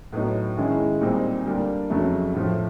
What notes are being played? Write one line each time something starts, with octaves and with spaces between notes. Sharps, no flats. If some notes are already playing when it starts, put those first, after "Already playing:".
A2 F#3 B3 D#4
D#3 G#3 C#4 E4
A#2 G3 C4 D#4
D3 G3 A#3 D4
F2 C#3 F#3 A3
A2 F3 A3